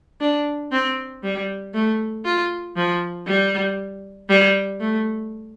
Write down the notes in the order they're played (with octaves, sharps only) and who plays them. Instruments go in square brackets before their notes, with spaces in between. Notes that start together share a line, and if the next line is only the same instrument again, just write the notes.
[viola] D4
C4
G3
A3
F4
F3
G3
G3
A3